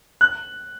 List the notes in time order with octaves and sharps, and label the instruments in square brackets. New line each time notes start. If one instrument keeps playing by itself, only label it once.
[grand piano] F#6